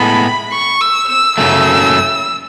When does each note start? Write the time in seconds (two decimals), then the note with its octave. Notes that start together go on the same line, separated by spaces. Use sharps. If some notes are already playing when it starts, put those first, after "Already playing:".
Already playing: A2 G#3 B3 A4 B5
0.52 C#6
0.81 E6
1.09 E6
1.37 F#2 C#3 F#3 A3 E6